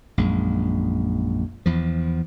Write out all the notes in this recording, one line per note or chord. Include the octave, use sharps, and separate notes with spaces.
A#1 F#2 G#3
E2 F3